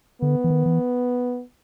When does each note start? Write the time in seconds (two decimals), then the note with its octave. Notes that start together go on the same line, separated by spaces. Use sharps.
0.22 D3 B3
0.44 E3
0.50 D#3
0.66 E3